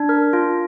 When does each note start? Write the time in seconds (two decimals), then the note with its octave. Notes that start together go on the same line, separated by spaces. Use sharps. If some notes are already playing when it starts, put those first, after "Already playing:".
Already playing: D4
0.09 A#4
0.33 F4